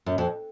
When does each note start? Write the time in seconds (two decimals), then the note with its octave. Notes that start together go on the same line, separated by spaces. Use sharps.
0.06 F#2
0.18 F2